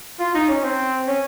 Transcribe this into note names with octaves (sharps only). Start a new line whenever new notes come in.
F4
D#4
C#4
C4
C#4